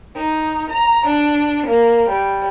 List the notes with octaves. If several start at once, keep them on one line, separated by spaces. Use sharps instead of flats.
D#4
A#5
D4
A#3
G3